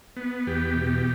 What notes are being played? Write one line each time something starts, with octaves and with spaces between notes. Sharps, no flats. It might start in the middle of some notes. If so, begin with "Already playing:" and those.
B3
E2 G4
B2